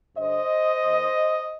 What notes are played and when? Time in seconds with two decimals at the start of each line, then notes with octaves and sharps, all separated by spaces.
0.16 G2 D3 C5 D#5
0.83 D#2 D#3